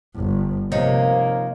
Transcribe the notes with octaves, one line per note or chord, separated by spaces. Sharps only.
G1
C3 F3 A#3 D#4 C#5